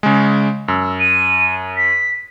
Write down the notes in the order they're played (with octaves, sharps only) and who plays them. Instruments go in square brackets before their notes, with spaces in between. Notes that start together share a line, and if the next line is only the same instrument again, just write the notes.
[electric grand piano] C#3 G#3
[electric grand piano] F#2 [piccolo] E6
[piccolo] D#7
B6